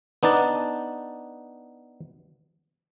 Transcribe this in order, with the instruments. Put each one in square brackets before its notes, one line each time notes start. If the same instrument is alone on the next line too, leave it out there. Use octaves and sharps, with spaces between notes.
[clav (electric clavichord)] B3 D4 D#4 A5